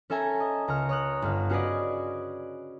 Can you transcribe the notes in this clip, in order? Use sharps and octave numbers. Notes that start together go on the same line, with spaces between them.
C#4 A4 E5 G#5 A#5
D#5
C#2 A#5 C#6 F6
C#5 D#6 F#6
G1 F5
C#4 F#4 G#4 B4 D5 D#5